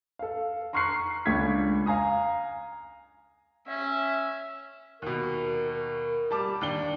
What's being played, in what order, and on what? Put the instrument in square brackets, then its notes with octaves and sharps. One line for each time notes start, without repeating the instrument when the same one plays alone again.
[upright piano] A4 F5
A#5 C6 C#6 F6 F#6 C7
C#2 D4 A4 C#6 G#6 B6
F5 G#5 A#5 D#6
[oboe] C#4 [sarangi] E5
[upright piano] D#2 B2 [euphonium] A#4
[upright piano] G3 A5 D6
D#2 D4 G7